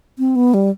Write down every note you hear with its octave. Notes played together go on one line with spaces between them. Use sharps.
C4
B3
G3